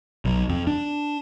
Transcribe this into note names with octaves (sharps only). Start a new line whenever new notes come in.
B1
F2
D4